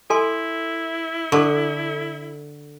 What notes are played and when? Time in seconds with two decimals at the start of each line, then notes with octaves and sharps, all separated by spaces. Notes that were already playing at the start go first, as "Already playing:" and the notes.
0.10 E4 A4 G#5 C6
1.32 D3 A4 C#6